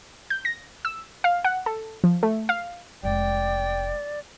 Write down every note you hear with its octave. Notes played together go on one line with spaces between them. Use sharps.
G6
A#6
E6
F5
F#5
A4
F3
A3
F5
F1 G#3 D5 G5